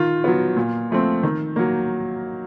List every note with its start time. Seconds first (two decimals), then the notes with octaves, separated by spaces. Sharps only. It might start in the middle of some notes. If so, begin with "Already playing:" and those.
Already playing: D#3 F4
0.24 F#3 B3
0.57 A#2
0.91 F3 A3 C4
1.23 D#3
1.56 F#3 A#3